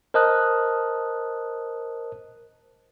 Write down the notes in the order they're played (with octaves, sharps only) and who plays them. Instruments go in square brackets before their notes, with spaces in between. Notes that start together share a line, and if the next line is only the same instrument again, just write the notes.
[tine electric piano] A#4 C5 D#5 A5 D#6 F#6